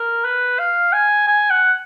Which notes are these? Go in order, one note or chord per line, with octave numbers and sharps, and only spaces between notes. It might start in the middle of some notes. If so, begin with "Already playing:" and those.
Already playing: A#4
B4
F5
G#5
G#5
F#5